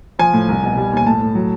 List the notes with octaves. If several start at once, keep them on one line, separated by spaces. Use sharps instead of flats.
F3 G#5
A2
C2
B2
G3
D#2
G#5
A2 A5
A2
F#3